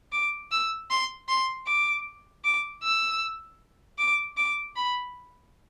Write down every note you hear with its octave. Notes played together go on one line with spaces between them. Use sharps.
D6
E6
C6
C6
D6
D6
E6
D6
D6
B5